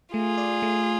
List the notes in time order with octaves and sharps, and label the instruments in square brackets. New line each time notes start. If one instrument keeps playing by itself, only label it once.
[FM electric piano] A3 [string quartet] F4 G#4
[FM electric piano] D5
A3